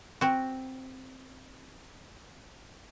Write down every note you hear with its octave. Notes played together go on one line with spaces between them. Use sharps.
C4 F#4